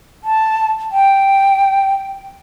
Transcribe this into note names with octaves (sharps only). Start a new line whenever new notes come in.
A5
G5